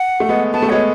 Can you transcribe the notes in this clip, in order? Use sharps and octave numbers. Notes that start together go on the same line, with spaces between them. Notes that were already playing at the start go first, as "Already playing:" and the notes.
Already playing: F#5
A3
G#3 B3
B3 A5
A3
G#3 B3 C#5